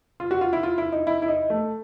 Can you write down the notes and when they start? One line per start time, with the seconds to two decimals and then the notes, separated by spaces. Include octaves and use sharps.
0.20 F4
0.31 F#4
0.41 F4
0.53 E4
0.63 F4
0.78 E4
0.92 D#4
1.07 E4
1.22 E4
1.28 D#4
1.50 A3